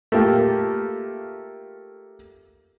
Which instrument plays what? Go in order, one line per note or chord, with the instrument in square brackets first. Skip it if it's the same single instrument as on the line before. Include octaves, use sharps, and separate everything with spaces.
[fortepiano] A3 A#3 F4 G4